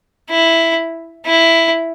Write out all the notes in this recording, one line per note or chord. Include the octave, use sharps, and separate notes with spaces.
E4
E4